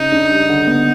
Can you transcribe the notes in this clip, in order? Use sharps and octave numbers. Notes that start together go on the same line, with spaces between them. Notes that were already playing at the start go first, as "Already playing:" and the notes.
Already playing: C#3 D#4
D4
G3
D3
B3